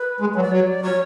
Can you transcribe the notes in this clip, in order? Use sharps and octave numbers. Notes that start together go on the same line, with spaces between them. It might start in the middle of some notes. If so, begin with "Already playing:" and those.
Already playing: B4
G#3
F#3
D5
F#3 C#5
D5
F#3 C#5